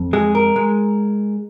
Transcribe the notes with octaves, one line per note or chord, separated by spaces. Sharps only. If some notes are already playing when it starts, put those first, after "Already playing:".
Already playing: F2
G#3 G#4
A#4
G#3